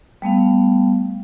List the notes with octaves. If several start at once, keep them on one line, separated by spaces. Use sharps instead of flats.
G3 A3 B3 F5